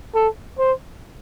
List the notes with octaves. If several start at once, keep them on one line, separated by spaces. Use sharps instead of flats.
A4
C5